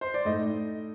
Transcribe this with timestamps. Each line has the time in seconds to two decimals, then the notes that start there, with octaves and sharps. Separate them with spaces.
0.01 C5
0.14 D5
0.25 A2 A3 D#4 D#5